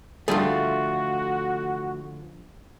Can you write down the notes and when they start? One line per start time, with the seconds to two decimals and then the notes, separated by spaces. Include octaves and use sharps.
0.28 D3 E3 F3 G3 A3 F4 F#4 G#4